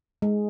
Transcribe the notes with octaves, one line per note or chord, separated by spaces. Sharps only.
G#3